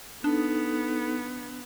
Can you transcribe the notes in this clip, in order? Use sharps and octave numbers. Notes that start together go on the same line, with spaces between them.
B3 D4 D#4 A4